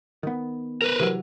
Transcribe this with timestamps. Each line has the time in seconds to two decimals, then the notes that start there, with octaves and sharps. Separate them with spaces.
0.23 D#3 B3
0.82 A#4 B4
1.00 C3 E3 F#3